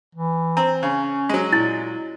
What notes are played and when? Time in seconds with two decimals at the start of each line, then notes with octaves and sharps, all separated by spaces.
0.15 E3
0.57 C4 A#5
0.83 C#3 C#4
1.29 F#3 G#3
1.53 A#2 E4